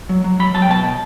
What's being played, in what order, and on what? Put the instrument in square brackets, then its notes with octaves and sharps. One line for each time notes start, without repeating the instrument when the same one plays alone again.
[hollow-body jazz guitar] F#3
F#3
F#3 B5
F#3 A5
G5
B2 A5
B2